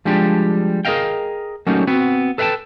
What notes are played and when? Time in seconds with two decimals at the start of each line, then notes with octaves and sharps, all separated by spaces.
0.05 F3 G3 G#3 D4 G4
0.85 G#4 A#4 C#5 D#5 F5 G5
1.67 F#3 G3 A3 A#3 C#4 D#4
1.87 B3 C4 F#4
2.38 A4 B4 E5 F5 G5 A5